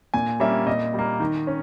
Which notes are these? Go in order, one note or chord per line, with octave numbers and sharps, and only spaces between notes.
A#2 G#5
G3 A#3 C#4 E5
A#2 D#5
G3 A#3
D#3
C#4